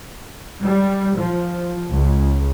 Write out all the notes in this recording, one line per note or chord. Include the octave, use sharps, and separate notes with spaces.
G3
F3
C#2